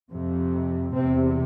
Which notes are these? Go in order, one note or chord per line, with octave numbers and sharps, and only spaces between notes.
F2 C3
E2 C3 C4